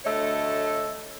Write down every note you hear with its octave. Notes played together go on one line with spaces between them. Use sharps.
D2 A3 A4 C#5 D#5